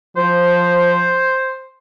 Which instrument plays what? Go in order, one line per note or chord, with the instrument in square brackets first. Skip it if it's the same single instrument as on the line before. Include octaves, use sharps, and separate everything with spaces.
[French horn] F3 [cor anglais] C5